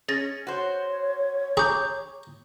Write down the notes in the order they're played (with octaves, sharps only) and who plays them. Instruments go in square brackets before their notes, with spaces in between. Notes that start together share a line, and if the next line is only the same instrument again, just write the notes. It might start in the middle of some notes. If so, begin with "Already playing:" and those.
[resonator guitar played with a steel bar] C#4 [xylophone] G#4 A6 A#6
[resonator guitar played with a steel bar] F#4 C5 [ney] C#5
[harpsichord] G#4 [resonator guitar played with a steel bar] A#5 [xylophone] C#6 D6 G6